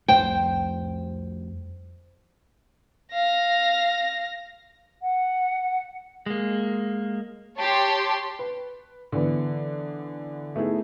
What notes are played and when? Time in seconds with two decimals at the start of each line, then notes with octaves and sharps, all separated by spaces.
0.08 F2 G3 A3 C5 G5
3.13 F5 A#6
5.01 F#5
6.26 G#3 A#3
7.57 G4 C#5 A5 C6
8.39 B4
9.12 D3 E3 B3
10.56 A3 B3 D#4 E4 G#4